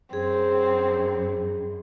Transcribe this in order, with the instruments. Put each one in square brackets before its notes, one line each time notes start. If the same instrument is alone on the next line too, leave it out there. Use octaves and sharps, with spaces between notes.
[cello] F#2 [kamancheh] C4 [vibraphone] G#4